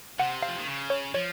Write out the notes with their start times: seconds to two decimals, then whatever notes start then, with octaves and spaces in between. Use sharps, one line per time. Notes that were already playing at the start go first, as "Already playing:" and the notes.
0.19 C3 F#5
0.42 F5
0.48 F3
0.58 D#3
0.67 C#3
0.90 C#5
1.14 F3 C#5